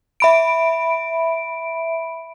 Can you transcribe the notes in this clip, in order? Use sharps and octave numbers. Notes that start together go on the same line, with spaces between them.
E5 B5 D7